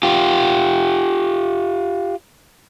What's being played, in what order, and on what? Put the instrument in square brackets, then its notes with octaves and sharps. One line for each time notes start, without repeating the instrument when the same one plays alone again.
[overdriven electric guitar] F4 G4